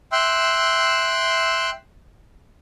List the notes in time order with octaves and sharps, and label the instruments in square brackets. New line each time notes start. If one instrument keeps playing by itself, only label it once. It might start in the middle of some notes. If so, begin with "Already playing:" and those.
[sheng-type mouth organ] E5 G5 C6 E6 F#6